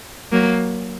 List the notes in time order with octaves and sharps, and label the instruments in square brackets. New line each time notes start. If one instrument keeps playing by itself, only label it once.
[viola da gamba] F#3 A#3